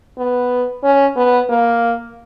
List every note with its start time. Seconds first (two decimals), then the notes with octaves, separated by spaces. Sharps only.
0.18 B3
0.83 C#4
1.16 B3
1.49 A#3